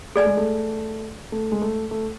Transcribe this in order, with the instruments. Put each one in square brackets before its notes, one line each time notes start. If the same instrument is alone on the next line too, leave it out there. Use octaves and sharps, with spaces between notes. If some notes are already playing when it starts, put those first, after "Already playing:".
[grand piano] A3 [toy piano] G#4 D5 G#5
[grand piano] G#3
A3
A3
G#3
A3
A3